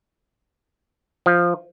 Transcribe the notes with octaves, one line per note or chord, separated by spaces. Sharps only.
F3